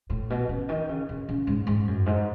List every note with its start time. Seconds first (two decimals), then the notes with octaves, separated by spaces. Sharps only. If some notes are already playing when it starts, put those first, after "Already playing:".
0.10 A2
0.30 B2
0.49 C#3
0.69 D#3
0.89 C#3
1.09 C#3
1.29 C#3
1.47 G#2
1.67 G#2
1.88 F#2
2.06 G#2